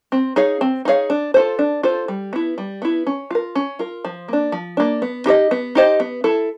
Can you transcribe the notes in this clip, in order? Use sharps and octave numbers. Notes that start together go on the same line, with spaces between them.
C4
D#4 G#4 C#5 F5
C4
D#4 G#4 C#5 F5
D4
F4 A4 C5
D4
F4 A4 C5
G3
B3 E4
G3
B3 E4
C#4
F4 A#4
C#4
F4 A#4
F3
A#3 D4
F3
A#3 D4
B3
D#4 G4 C5 D#5
B3
D#4 G4 C5 D#5
B3
E4 A4